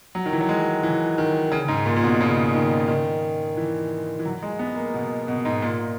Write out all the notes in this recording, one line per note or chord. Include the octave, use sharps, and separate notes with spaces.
F#3
D#3
E3
F#3
G#3
E3
D#3
C#3
G#2
A#2
A#2
B2
C#3
D#3
D#3
E3
E3
F#3
G#3
B3
A#3
B2
B2
G#2
A#2